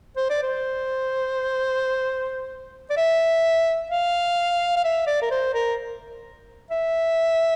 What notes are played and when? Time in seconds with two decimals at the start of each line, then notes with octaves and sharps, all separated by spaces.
0.17 C5
0.30 D5
0.42 C5
2.90 D5
2.97 E5
3.90 F5
4.76 F5
4.84 E5
5.07 D5
5.22 A#4
5.31 C5
5.54 A#4
6.71 E5